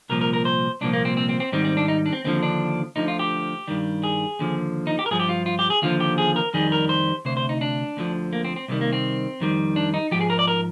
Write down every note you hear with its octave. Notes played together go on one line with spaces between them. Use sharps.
C2 A#2 F3 A#4
A#4
A#4
C5
C2 A#2 F3 D4
A#3
C4
C4
C4
C4
G#2 D#3 G3 C4
C4
D4
D#4
D4
C4
D#2 D3 F3 C4
D4
D2 D3 F3 D#4
F4
G4
G2 D#3 G3
G#4
D#2 D3 F3
D#4
G4
A#4
G2 F3 G#4
G4
F4
F4
G4
G#4
D#2 D3 F3 F4
G4
G#4
A#4
F2 D#3 G3 G#4
A#4
C5
D2 C3 C5
C5
D#4
D4
D2 D3 F3
A#3
C4
C4
C2 C3 D#3 G3
A#3
C4
F2 D#3 G3
D4
D#4
G#2 F3 G4
G#4
A#4
D5
A#4